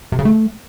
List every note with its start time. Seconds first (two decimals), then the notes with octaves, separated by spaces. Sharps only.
0.12 C3
0.19 C#3
0.25 A3